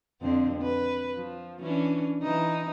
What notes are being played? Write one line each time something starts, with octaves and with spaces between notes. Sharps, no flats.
F2 D3 C4
B4
F3
E3 C#4 D4
E3 D#4